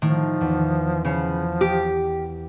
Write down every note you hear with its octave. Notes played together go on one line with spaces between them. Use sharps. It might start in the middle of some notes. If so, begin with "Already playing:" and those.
A2 D#3 F3
E2
C#3 F3
G4